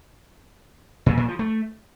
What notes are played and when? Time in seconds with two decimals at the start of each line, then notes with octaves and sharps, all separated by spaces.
1.06 A#2
1.17 A#2
1.28 F3
1.39 A3